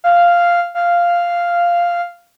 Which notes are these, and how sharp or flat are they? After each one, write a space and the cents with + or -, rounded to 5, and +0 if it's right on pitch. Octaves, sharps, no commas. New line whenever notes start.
F5 -5
F5 -5